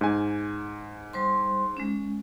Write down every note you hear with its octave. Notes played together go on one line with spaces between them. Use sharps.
G#2 G#5
G3 C5 C6
G#3 C#4